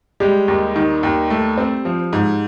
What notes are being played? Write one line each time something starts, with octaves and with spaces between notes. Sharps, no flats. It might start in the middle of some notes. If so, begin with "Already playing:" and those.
G3 G#3 G4
D#2
D#3
D#2
A3
C4
F3
G#2